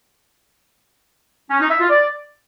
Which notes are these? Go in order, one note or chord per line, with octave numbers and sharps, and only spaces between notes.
C#4
D#4
E5
F4
D5